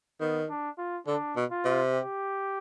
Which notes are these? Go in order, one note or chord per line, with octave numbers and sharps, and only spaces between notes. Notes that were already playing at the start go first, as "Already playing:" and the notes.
D#3 B3
D4
F4
D3 D4
B2
F4
C3
G4